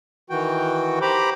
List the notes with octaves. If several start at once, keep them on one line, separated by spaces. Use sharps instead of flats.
D#3 E3 F#4 G5
G4 C5 A#5 B5 D6